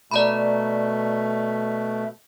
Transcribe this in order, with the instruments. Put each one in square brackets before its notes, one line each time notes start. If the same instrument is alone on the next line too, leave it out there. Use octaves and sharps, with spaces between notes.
[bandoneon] B2 A3 [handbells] D5 A#5 B5